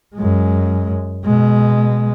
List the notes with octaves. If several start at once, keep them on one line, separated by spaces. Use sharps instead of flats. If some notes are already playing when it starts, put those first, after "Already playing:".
F#2 G#3
B2 G#3